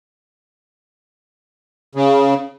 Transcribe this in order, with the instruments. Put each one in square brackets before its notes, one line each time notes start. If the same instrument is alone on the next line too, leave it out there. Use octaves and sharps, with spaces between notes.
[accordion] C#3